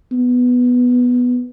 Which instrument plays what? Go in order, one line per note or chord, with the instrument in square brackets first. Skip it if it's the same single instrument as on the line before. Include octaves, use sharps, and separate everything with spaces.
[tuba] B3